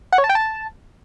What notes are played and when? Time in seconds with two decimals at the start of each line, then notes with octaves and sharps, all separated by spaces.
0.13 F#5
0.18 C#5
0.24 A5
0.29 G5
0.35 A5